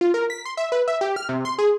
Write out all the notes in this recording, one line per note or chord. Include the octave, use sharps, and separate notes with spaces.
F4
A#4
B6
C6
E5
B4
E5
G4
F6
C3
C6
G#4